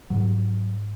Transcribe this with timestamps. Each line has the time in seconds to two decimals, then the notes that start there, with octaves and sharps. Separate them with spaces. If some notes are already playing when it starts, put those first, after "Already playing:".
0.10 G#2 F#3